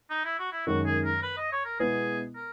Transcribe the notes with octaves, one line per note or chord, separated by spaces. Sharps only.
D#4
E4
F#4
E4
F#2 D#3 G#3 C#4 F#4
G#4
A#4
B4
D#5
C#5
A#4
B2 G#3 B3 E4 G#4 B4
A#4